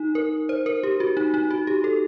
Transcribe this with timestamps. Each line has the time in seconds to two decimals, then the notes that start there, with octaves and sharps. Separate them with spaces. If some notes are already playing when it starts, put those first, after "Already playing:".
Already playing: D#4
0.15 A#4
0.49 C5
0.66 A#4
0.83 G4
1.00 F#4
1.17 D#4
1.34 D#4
1.51 F#4
1.67 G4
1.84 A4